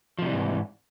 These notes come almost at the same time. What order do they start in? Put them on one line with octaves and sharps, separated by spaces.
F3 C3 G3 E3 G#2